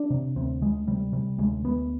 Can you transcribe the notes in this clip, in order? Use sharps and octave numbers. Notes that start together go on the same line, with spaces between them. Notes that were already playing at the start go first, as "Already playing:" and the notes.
Already playing: D4
C3
D2 C4
D2 G#3
C3 G3
C3 G3
D2 G#3
D2 B3